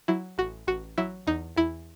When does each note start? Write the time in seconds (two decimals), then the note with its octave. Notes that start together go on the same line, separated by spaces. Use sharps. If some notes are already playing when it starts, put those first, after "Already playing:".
0.08 F#3 E4
0.38 A1 F#4
0.67 A1 F#4
0.98 F#3 E4
1.27 E2 D#4
1.56 E2 E4